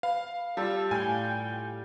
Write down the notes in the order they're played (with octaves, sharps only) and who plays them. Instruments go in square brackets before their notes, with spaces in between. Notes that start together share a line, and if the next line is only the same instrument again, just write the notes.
[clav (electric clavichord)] B4 [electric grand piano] F5
[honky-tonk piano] G3 F4 [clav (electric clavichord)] A4 [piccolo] E6
[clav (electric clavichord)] A2 [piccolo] G5 [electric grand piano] G#5